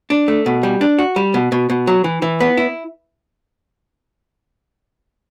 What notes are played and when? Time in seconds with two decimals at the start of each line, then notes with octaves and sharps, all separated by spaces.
0.10 D4
0.28 A3
0.46 B2
0.63 G3
0.81 D4
0.99 F#4
1.16 G3
1.34 B2
1.52 B2
1.70 B2
1.87 F#3
2.04 E3
2.22 E3
2.40 B3
2.57 E4